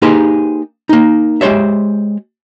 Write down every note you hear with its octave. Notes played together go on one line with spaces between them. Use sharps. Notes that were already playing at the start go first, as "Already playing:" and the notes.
A#3 D#4 G4 G#4 B4 C5
A#3 D#4
G#3 G4 C5 C#5 E5